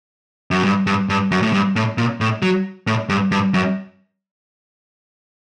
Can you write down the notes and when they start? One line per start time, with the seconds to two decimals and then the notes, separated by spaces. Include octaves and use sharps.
0.51 F#2
0.64 G2
0.87 G2
1.09 G2
1.31 F#2
1.43 A2
1.53 G2
1.76 A2
1.98 A#2
2.21 A2
2.42 F#3
2.87 A2
3.09 G2
3.31 G2
3.54 F#2